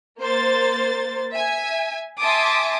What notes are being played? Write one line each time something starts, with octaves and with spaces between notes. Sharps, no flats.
A#3 C5 A6
E5 G#5
E5 G#5 A5 C6 D6 D#6